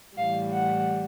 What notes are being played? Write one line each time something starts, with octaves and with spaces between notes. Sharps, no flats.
A2 E3 G3 F5
F#5